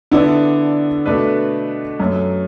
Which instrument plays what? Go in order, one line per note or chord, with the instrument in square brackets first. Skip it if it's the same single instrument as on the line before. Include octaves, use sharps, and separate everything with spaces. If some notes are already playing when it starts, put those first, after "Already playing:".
[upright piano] D3 B3 E4 A4 D5
B2 A3 D4 B4
F#2 F#3 A3